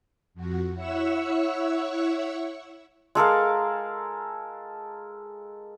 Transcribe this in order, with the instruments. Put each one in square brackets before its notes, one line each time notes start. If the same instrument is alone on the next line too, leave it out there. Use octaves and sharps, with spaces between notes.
[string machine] F2 F#4
E4 C#5 E5 F#5 C#6 E6
[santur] G#3 A4 A#4 F5